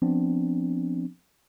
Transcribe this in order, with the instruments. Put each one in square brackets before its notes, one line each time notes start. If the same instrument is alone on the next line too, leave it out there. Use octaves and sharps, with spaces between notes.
[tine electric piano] F3 B3 C4 D4